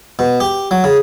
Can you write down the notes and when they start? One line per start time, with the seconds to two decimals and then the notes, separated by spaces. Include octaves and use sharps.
0.19 B2
0.40 G4
0.71 F#3
0.84 C#3